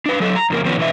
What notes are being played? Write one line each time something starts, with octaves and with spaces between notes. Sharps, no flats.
D4 B4
D3 F#3 A4
A#5
F2 C#3 A#3 A#4
D#3 F3 B3 C#4 B4
B2 E3 D4 B4 E5